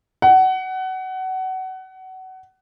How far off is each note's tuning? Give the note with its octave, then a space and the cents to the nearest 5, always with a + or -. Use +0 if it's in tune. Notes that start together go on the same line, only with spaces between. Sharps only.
F#5 +25